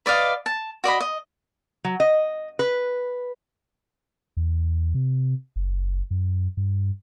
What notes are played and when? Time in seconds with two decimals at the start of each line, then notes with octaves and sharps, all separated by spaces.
0.06 B4 D5 D#5 F5
0.46 A5
0.84 F#4 D5 D#5 B5
1.01 D#5
1.84 F#3
2.00 D#5
2.59 B4
4.37 E2
4.95 C3
5.56 F#1
6.11 F#2
6.57 G2